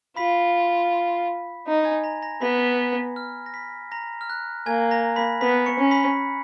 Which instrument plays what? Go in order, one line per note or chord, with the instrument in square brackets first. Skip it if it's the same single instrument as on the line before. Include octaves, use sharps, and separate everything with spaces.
[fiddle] F4 [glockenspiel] B5 B6
[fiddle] D#4
[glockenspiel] G#5 G#6
A#5 A#6
A#5 A#6
[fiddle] B3 [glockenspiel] B5 B6
[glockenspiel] F6
A#6
B5 B6
A#5 A#6
F6
F#6
[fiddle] A#3 [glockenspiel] G#5 G#6
[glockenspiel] A#5 A#6
B5 B6
[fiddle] B3 [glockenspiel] B5 B6
[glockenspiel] C#6 C#7
[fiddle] C#4
[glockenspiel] B5 B6